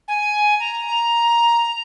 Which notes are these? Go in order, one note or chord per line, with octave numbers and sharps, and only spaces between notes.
G#5
A#5